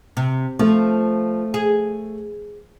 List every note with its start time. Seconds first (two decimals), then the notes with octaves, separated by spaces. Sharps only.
0.17 C3
0.59 F3 A3
1.54 G#4